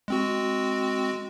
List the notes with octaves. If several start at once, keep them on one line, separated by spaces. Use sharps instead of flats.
G#3 C4 F#4